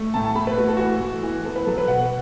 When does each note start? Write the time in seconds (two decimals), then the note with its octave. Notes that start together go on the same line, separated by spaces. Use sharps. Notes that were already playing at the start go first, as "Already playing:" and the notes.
Already playing: A3
0.14 A2 A5
0.25 A5
0.36 A3 B5
0.47 B4
0.58 A3 F#4
0.68 A4
0.77 E3 F#4
1.01 A3
1.23 E3
1.45 B3 A4
1.56 B4
1.66 F#3 A4
1.78 B4
1.88 B2 F#5